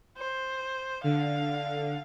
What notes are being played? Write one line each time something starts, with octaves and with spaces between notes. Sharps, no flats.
C5
D3 F5